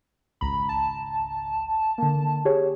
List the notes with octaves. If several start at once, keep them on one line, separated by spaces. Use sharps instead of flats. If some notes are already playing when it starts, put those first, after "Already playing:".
G#1 C#2 A#5 B5
A5
D3 A#3
G4 G#4 C#5